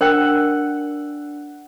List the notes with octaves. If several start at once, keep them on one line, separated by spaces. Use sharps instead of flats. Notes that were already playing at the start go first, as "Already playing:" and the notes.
D4 A#4 F#5 G5 E6 F#6